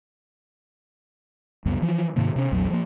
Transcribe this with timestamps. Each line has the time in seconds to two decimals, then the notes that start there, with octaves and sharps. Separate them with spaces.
1.65 C#2 F#2 G3 B3
1.82 E3 F3
2.16 G#2 C3 D#3 A#3
2.36 C3 C#4
2.52 A#1 E2 F#3
2.70 F3 A#3